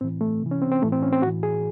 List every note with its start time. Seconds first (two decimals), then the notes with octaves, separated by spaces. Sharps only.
0.01 A2 E3 C4
0.21 A3
0.42 C3 E3
0.51 C#4
0.62 C4
0.72 C4
0.82 A2 E3 A3
0.92 C4
1.03 C#4
1.13 C4
1.22 A2 E3 F#4
1.43 G#4